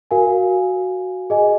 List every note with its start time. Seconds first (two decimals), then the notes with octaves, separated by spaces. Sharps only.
0.11 F#4 A#4 F5 G#5
1.30 G#4 D#5 G#5